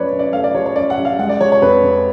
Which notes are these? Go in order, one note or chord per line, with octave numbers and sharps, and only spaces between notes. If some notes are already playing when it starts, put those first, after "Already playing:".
Already playing: F#2 F3 A3 B4 C#5 D5
F#2
D5
A3 F5
D5
F3 C#5
C#5
F#2 D5
F#5
F#2
F5
G#3 F#5
D5
F3 C#5
C#5
F2 B4
F2